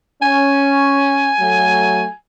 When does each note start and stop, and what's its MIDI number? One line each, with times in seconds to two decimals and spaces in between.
0.22 1.30 61
0.22 2.13 80
1.39 2.05 54
1.39 2.05 57